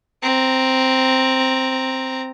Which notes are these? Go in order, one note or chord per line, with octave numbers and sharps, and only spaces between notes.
C4 A#5